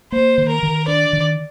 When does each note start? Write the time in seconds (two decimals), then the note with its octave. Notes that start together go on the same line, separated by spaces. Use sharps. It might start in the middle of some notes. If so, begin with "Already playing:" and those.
0.12 A#3 C5
0.38 D#3
0.50 A#4
0.63 D#3
0.88 D4 D5
1.13 D#3